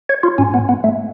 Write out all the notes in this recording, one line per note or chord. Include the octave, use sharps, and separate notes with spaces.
C#5
F4
G#2 C#4
B3
B3
A3